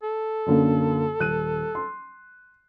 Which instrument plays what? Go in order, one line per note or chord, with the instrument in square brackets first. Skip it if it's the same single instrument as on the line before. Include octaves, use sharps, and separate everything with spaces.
[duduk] A4
[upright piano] F#2 D3 A#3
D#1 F#6 D#7
C6